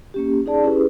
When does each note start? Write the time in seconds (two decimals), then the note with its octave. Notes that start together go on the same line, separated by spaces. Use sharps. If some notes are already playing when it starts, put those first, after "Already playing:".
0.14 A#3 C#4 G4
0.45 C#4 D#4 G#4 D5 A5
0.63 C#4 E4 G4 G#4 B4